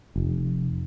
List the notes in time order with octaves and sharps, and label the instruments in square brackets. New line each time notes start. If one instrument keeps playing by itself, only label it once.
[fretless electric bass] F1